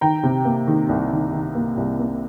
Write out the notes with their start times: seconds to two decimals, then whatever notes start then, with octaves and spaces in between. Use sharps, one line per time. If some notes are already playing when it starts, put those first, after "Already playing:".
0.01 D#3 G5 A#5
0.23 C3
0.45 A#3
0.67 D#3
0.89 C2
1.11 D#3
1.33 D#3
1.55 A#3
1.77 C2
1.99 A#3